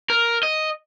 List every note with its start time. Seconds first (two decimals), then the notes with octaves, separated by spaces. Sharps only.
0.10 A#4
0.43 D#5